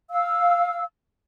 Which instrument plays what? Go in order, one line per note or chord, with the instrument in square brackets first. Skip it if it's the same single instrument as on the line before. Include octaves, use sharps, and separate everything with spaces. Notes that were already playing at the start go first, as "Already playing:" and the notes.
[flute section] F5 E6